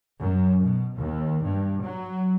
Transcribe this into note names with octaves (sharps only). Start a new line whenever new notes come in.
F#2
B2
D#2
G2
F#3